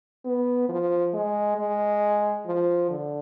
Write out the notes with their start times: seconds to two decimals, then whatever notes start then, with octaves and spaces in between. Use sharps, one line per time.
0.25 B3
0.69 F3
1.13 G#3
1.57 G#3
2.46 F3
2.90 D3